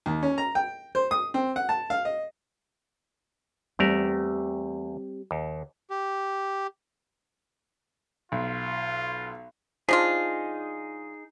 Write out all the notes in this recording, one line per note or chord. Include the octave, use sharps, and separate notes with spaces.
D#2
C#4
A#5
G5
C5
D#6
C4
F#5
A5
F5
D#5
E2 G3 A3 C4 G4 A#4
D#2
G4
B1 F4
F3 D4 D#4 F4 G#4